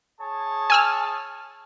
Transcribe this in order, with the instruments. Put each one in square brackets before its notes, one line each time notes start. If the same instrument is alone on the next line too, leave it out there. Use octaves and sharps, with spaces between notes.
[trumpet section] G#4 C#5 A5
[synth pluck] G#5 E6 F6